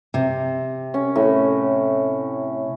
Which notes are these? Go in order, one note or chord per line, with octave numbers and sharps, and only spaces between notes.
C3
C#4
A2